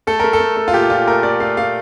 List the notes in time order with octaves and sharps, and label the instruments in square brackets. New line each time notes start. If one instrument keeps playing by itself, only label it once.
[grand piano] A3 A4
A3 A#4
A4
A3
A3
F4
A#2 G4
A#2 F4
A3 A#4
A3 D5
A3 F5
A3 F5